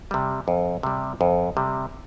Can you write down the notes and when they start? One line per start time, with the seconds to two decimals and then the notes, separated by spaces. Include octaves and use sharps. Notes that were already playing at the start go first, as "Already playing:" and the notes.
0.11 C3 G3
0.48 F2
0.83 C3 G3
1.21 F2
1.57 C3 G3